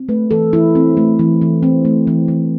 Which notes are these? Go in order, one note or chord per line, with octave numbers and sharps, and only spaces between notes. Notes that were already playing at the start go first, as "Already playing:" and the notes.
Already playing: C4
A3 B4
E3 A4
E3 E4
C4
A3
E3
E3
C4
A3
E3
E3